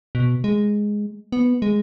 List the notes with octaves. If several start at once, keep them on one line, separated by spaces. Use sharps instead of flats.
B2
G#3
B3
G#3